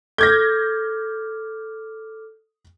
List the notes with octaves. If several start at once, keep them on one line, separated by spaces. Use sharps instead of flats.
A4 D6 F6 G6 G#6 A#6